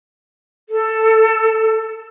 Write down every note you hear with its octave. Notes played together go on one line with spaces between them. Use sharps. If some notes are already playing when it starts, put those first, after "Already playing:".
A4